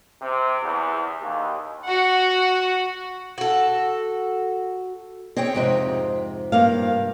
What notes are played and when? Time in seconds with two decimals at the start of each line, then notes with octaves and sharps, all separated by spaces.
0.22 C3
0.63 E2
1.20 D#2
1.84 F#4 F#5
3.38 F#4 A4
5.37 C4 G#4 C#5 G5
5.55 F2 G#2 C3
6.52 G2 A#3 F5